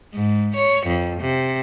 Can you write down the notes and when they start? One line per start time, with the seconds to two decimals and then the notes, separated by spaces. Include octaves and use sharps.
0.14 G#2
0.56 C#5
0.87 F2
1.20 C3